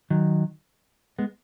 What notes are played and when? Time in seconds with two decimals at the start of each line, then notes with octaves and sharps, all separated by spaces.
0.10 D#3 F#3
1.19 G#3 B3